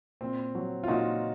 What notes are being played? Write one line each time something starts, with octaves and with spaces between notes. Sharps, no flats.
A#2 C4
F#3
F4
A#2 D#4 F#4